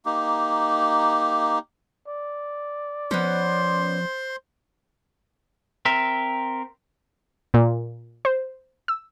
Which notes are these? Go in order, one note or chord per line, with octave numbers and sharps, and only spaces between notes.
A#3 D#4 G4
D5
F3 B3 C#4 C5 C6
C4 A#4 E5
A#2
C5
E6